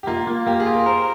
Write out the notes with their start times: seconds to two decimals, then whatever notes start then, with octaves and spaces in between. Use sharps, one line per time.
0.03 G4
0.07 A#3 F4
0.27 A#3
0.47 A#3 G4
0.60 G#4
0.66 F4
0.74 A#4
0.86 A#4 C5